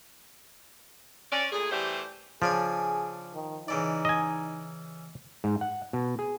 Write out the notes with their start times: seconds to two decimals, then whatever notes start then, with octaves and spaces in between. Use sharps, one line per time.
1.32 C#4 D5
1.52 A#2 A3 G#4
1.71 E3 G3 A3 G4 C5
2.42 C#3 F3 D4 G#4 G#5
3.34 D#3
3.68 C#3 E3 D#4 D5
4.05 D#5 G#5
5.44 G#2
5.61 F#5
5.93 B2
6.19 G#4